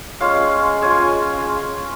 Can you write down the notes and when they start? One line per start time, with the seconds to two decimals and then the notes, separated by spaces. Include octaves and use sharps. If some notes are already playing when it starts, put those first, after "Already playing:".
0.21 G#3 C#4 F4 F5
0.82 G#3 C#4 F4 G#5